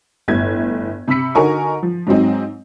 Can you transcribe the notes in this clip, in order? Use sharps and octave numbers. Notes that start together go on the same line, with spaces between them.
G1 A2 G#6
C3 B5 E6 B6 C#7
D3 D#4 F#4 A#4 G#5 C#6
F3
G#2 F#3 G#3 C4 D#4